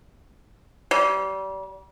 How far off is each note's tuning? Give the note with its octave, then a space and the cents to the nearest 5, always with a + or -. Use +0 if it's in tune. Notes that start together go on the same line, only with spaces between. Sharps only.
G3 -30